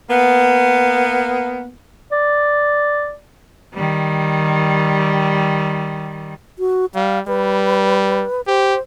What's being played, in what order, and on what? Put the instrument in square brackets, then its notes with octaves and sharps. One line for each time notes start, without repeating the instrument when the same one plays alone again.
[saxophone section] A#3 B3
[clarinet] D5
[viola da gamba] D#3 G3
[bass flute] F#4
[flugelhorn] G3 [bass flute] F5
[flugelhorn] G3 [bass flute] B4
[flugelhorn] G4 [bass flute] C5